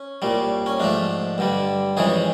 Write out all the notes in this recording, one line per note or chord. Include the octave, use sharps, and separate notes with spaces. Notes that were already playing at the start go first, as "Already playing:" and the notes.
Already playing: C#4
C2 A#2 G3
C#4
G#2 F3 A3 D4
G2 D3 G3
F2 C#3 E3 G#3 G#4